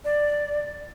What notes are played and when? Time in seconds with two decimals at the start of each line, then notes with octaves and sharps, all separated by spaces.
0.05 D5